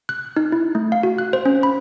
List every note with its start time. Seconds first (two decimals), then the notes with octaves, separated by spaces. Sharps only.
0.09 F#6
0.37 D#4
0.52 E4
0.75 A3
0.92 F5
1.03 F#4
1.18 F#6
1.33 C5
1.46 C#4
1.63 B5